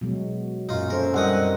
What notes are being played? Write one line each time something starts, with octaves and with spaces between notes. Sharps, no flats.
B2 F#3 G#3
F#2 A#2 D#4 F4
C#4 A4 A#4 C5
C2 C4 A#4 D#5 F#5 D#6